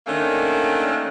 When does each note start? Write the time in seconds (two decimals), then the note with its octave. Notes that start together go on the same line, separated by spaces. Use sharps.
0.07 D#3 A3 A#3 C#4 D4